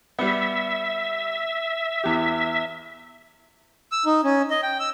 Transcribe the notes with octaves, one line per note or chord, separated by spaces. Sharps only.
G3 B3 E5
E2 G4
E6
D#4
C#4
D#5
G5
E6